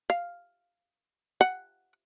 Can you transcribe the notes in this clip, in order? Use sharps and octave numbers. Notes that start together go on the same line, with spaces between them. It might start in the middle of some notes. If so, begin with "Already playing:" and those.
F5
F#5